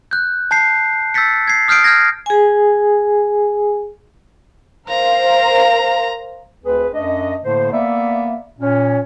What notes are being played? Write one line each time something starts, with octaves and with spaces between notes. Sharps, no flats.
F#6 G6
A5 G6 C7
E6 G6 A6 B6 C#7
G#6 C7
D#6 F6 G6 C7 D7
F6 G6 G#6 A#6
G#4 G#5
A#4 C5 F5 A#5
D2 C4 G#4 B4
F#2 A3 D4 D#5
A2 D3 A3 A#3 C5
A#3 B3 D5 E5
A#2 C#4